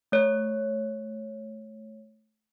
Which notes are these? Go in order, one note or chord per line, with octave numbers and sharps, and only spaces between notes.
A3 C#5